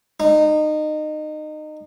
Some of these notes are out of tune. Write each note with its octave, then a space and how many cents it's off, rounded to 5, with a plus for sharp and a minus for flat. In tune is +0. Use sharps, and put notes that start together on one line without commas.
D#4 -25